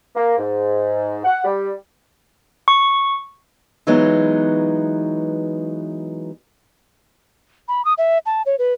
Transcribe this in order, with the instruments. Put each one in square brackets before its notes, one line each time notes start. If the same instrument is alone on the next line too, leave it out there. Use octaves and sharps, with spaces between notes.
[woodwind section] A#3
G#2
F#5
G3
[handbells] C#6
[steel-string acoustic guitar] E3 F#3 G#3 B3 D#4
[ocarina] B5
D#6
E5
A5
C#5
B4